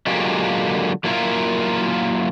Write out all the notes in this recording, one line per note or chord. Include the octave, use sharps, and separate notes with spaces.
D3 F#3 G#3 A#3 F4 G4
F#3 A#3 E4 F4 A#4